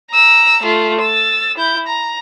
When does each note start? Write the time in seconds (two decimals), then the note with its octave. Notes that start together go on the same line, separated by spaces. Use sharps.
0.11 A#5 E6
0.62 A3 F4
1.01 E6 A6
1.58 E4 G6
1.87 A#5